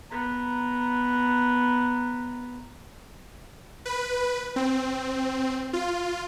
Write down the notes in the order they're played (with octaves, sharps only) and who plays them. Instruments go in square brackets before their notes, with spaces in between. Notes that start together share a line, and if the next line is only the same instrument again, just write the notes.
[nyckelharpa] B3 A#5
[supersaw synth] B4
C4
F4